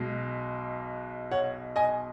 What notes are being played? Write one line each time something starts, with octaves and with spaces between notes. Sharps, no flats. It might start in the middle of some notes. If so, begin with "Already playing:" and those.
Already playing: B1 B2 G#3
C#5 F#5
D#5 G#5